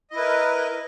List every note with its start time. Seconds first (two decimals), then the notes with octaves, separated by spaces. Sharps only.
0.11 D#5
0.14 E4
0.17 B4
0.20 A#4